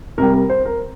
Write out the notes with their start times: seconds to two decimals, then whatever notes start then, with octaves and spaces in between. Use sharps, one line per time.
0.18 C2 C3 G3 A#4
0.34 A#4
0.50 C5
0.65 A#4